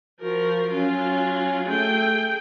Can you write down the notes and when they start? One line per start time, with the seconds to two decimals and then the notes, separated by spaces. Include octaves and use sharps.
0.21 F3 F#4 A#4
0.71 F#3 C#4 F4
1.68 A3 G#4 G5